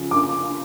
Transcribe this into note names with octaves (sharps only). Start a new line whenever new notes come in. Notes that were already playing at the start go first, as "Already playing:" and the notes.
Already playing: C#3 F3
D6